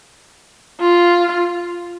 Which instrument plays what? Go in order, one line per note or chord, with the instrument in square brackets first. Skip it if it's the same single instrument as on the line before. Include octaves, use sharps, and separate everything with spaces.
[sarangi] F4